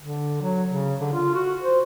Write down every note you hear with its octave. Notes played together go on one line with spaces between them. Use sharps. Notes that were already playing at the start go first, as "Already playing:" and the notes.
D3
F#3
C#3
D3
F4
F#4
C5